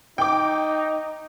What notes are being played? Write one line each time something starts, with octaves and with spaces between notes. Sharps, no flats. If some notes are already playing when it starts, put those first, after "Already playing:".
D#4 G5 D6